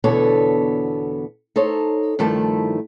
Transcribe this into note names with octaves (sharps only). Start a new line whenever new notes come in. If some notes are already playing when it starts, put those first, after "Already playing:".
E2 B2 D3 B3 A4 C#5
D#4 A4 C5 C#5
G2 D#3 F3 A3 E4 A5